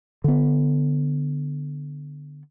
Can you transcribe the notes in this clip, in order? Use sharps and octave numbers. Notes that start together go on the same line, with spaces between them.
D3 B3